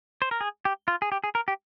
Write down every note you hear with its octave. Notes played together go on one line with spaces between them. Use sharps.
C5
A#4
G#4
G4
F4
G#4
G4
G#4
A#4
G4